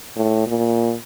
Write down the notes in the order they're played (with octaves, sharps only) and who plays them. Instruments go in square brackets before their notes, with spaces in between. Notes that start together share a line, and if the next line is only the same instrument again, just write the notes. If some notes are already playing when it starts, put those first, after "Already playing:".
[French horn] A2
A#2